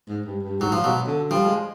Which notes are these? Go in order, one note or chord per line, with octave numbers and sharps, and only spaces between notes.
G#2
G2
G2
G#2 F#3
F3
B2 F#3
D3
F3 G3
G#3